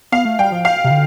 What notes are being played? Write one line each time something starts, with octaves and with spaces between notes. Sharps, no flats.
B3 F5
A3
G3 G5
F3
F5
C3
D3